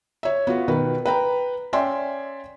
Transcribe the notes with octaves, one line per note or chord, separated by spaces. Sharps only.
C#5 E5
B3 F4 F#4
B2 D#3 B4
B4 G5 A#5
C#4 D5 E5 G5 G#5 C6